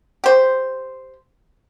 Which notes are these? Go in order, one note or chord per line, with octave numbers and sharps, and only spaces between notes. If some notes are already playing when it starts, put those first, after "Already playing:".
G4 C5